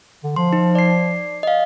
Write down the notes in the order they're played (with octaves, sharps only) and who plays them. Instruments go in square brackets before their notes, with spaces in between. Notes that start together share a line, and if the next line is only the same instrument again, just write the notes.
[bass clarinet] D3
[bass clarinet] F3 [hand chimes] C6
[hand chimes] D#4
D5 C7
D#5 F5